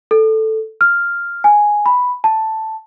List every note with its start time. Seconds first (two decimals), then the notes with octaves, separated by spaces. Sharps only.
0.11 A4
0.81 F6
1.44 G#5
1.86 B5
2.24 A5